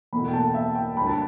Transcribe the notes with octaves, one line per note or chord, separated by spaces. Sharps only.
E2 B2 A3 B5
G5
A5
E5
G5
D2 D3 G3 B5
A5